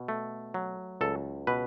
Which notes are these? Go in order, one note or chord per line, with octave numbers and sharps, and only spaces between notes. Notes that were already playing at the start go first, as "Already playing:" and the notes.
Already playing: B2
A3
F#3
C#2 A4
B2 B4